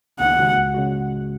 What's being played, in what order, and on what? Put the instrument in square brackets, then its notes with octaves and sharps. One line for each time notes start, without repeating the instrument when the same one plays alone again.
[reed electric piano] C#2 [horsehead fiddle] F#5
[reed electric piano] C#3 G#3 F#4
C#2
C#3 G#3 F#4